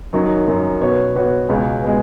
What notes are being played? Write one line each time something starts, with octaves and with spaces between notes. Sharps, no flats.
F#2 D#3 F#3 D#4
F#2 D#3 F#3 D#4
B2 B3 F#4 C#5
B2 B3 F#4 C#5
C#2 B2 G#3
B2 G#3